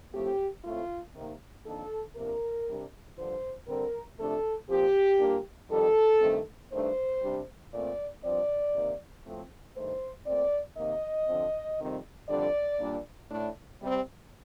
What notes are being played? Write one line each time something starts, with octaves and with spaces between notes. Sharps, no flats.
A2 F3 A3 C4 G4
A2 A3 C4 F4
C3 D#3 A#3
F2 D#3 A#3 D4 A4
C3 F3 A#3 D4 A#4
C3 G3 D4
G2 D3 F3 C5
D3 G3 C4 A#4
C3 F3 A3 D4 A4
A#2 F3 C4 G4
A#2 G3 A#3 D4
F2 D#3 G3 A4
G2 D#3 A3 C4
G2 D#3 A3 D4 C5
C3 G3 D4
A#2 A3 C4 D5
G2 F3 C4 D5
C3 D#3 A#3
A2 F3 A3 C4
G2 D#3 A3 C5
A#2 A3 C4 D5
C3 D#3 A#3 D#5
D3 F3 C4
F2 C3 D#3 G3 C4
F2 D3 G3 D4 D5
A#2 G3 A#3 D4
A2 A3 D4
C3 G3 C4